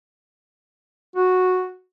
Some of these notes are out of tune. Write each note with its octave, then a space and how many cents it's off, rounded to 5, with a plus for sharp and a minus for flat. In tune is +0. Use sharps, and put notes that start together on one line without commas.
F#4 -5